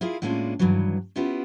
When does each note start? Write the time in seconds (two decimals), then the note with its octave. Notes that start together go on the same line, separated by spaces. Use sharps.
0.01 E4 F4 G#4 A#4 F5
0.22 A2 G#3 A#3 C#4 D4 F4
0.59 G2 D#3 E3 F#3
1.16 B3 C#4 E4 F4 G4